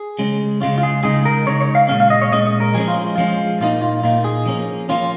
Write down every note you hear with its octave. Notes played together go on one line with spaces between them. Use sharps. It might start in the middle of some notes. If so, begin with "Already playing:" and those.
Already playing: G#4
C#3 G#3 C#4
C#3 G#3 C#4 F4
F4
G#4
C#3 G#3 D#4 G#4
A#4
C#3 G#3 D#4 C#5
C#5
F5
A#2 G#3 C#4 F5
F5
D#5
C#5
A#2 G#3 C#4 D#5
D#5
A#4
F3 G#3 C#4 G#4
F4
F3 G#3 C#4 F4
A#2 A#3 D#4 F4
F4
A#2 A#3 D#4 F4
G#4
F3 A#3 C#4
F3 A#3 C#4 F4